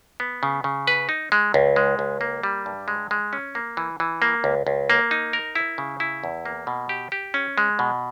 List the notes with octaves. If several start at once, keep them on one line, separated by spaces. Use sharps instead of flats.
B3
C#3
C#3
B4
D#4
G#3
C#2
G#3
C#2
A#3
G3
G2
G#3
G#3
C#4
A#3
E3
E3
A#3
C#2
C#2
A#3
D#4
A#4
E4
C#3
E4
E2
A#3
B2
G4
G4
C#4
G#3
B2